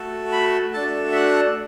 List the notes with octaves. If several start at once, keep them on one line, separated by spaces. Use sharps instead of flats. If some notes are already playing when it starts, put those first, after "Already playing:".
Already playing: A3 F#4 A4
B5
A3 D4 F#4 A4 A5
E5
F#5